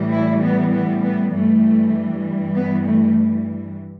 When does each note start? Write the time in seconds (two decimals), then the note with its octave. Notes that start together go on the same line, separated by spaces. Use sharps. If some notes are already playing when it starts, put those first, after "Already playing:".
Already playing: A2 E3 G3
0.12 E4
0.42 B3
0.73 B3
1.03 B3
1.33 G2 E3 G3 A3
2.55 B3
2.86 A3